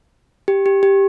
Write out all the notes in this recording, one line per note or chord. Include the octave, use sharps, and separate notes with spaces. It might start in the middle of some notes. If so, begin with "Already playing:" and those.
G4
G4
G4